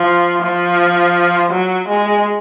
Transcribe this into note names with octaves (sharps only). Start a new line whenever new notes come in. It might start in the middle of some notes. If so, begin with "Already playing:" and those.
Already playing: F3
F3
F#3
G#3